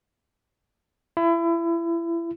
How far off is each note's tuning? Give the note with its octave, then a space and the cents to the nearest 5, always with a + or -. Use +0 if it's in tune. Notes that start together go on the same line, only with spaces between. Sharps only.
E4 +30